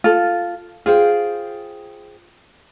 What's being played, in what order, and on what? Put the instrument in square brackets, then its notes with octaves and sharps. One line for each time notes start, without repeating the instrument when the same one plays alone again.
[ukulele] F4 A4
[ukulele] F4 [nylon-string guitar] G#4 C5 G5